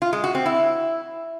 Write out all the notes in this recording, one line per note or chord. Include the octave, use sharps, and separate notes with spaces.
F4
G#3
F#4
C4
E4